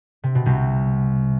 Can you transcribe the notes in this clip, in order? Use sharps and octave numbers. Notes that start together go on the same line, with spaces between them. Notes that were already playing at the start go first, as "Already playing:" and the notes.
C3
B2
C2 C3